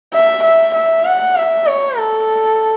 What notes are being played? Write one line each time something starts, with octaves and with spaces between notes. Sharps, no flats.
E5
E5
E5
F#5
E5
C#5
A4